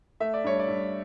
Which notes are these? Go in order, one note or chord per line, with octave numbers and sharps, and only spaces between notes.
A3 E5
D5
G2 C#5
D5
G2